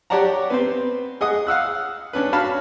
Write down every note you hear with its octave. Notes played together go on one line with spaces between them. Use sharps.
G4 C#5 D5 F#5 A5 A#5
B3 C4 C5
G#4 D#5 F#5 D#6
F5 F#5 E6 F#6
C#4 D4 B4
F#4 C#5 F5 A5 B5 F6